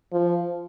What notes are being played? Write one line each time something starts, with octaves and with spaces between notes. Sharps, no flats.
F3